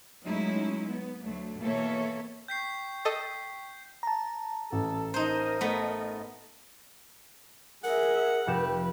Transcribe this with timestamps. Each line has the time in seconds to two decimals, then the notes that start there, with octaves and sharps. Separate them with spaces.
0.24 F#3 G#3 A3 C#4 D#4 E4
0.86 B3
1.23 D2 F#3 A3
1.61 B2 E3 A#3 A4 C#5 E5
2.48 G5 C#6 G6 B6 C7
3.05 A4 D#5
4.03 A5 A#5
4.72 A1 A4
5.14 D#4 A#4 C5 D#5
5.61 A3 B3
7.84 G#4 A#4 E5 F#5
8.47 F1 G4 B4 E7